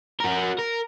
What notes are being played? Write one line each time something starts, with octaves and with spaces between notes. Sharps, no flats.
F#4 A#4
A#4